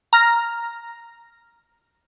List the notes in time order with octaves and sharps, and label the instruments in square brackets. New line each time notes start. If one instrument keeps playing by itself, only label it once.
[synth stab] A#5 F6 A#6